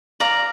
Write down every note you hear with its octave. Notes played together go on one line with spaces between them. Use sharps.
D5 F5 A#5